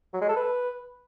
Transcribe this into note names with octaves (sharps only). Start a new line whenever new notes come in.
F#3
G#3
A4
B4